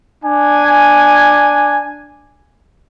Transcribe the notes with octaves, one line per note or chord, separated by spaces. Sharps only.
D4 G#5